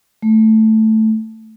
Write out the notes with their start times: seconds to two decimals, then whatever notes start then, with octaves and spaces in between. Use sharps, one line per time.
0.22 A3